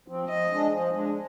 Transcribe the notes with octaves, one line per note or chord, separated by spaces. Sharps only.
F3 C4
F3 D#5
G#3 D4
F3
G#3 D4